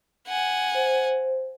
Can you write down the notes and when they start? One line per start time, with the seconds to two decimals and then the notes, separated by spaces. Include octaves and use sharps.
0.28 F#5 G#5
0.75 C5